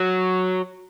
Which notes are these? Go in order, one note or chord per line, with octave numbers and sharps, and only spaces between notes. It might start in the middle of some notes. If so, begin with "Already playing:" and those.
Already playing: F#3